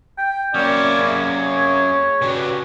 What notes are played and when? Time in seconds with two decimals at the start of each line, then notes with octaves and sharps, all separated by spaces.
0.18 G5
0.55 C3 F#3 A#3 C#4 E4 D5
1.00 F#2 G#4
1.39 C#5
2.22 C#3 D4 F#4 G4 B4